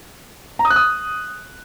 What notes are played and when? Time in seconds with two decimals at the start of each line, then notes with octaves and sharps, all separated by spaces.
0.59 A#5
0.65 D#6
0.70 F#6
0.76 D#6